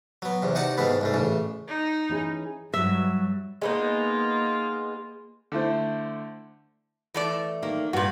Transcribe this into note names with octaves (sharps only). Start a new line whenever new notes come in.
F#3 B3
E2 C3
C3 D#4 F#4 D5 F#5 A5
G#2 B2 D#3 B3 E4
C2 G#2 A3
A1 C#3
D#4
E3 C#4 G#4
G2 F#3 E5
G#3 A#3 B3 D#4 F4
D3 A3 E4 C5
E3 A3 D5
D#3 A#3
G2 A#2 F#4 B4